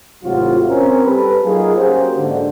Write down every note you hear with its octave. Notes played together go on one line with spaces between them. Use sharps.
G#1 A2 C3 F#3 F4 F#4
C4 C#4 A#4
G3 A4 B4
F#3 A#3 D#4 F4 G#4
A#3 C#4 F#4 G4 C5
G#2 D3